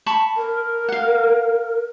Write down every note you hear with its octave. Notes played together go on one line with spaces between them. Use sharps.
A5 B5 C#6
A#4
F5 F#5